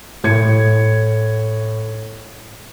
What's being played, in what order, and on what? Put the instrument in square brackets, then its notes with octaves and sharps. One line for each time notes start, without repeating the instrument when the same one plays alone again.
[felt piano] A2 G#6 C#7